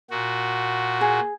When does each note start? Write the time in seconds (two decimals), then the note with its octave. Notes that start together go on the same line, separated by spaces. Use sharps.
0.10 A#2 F#4
1.01 G#4